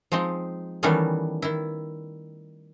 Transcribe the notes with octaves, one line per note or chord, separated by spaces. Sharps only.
F3 G#3 C4 D#4
D#3 E3 G3 A3 B3 C#4
D#3 E4